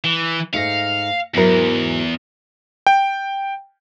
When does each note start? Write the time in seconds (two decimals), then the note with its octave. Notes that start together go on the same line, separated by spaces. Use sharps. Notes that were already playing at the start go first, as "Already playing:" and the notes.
0.04 E3
0.54 G#2 A3 D#4 F5 A#6 C#7
1.34 E2 G#2 F#3 E4 A#4 A#6
2.87 G5